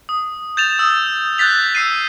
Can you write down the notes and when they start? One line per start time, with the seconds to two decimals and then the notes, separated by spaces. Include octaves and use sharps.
0.09 D#6
0.57 G6 A6 E7 F7
0.79 D#6 E6
1.38 F#6 G6 A6 B6 F7
1.75 E6 C7 D#7